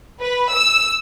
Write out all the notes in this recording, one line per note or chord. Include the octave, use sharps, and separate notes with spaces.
B4
E6